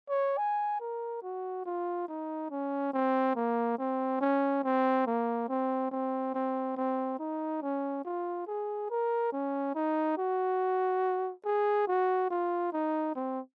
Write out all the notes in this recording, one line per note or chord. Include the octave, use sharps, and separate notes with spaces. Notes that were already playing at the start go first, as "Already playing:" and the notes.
C#5
G#5
A#4
F#4
F4
D#4
C#4
C4
A#3
C4
C#4
C4
A#3
C4
C4
C4
C4
D#4
C#4
F4
G#4
A#4
C#4
D#4
F#4
G#4
F#4
F4
D#4
C4